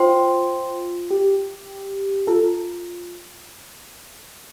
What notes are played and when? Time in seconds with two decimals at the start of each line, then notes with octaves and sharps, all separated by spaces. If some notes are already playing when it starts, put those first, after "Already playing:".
Already playing: F4 C5 G5 C6
1.11 G4
2.27 F4 A4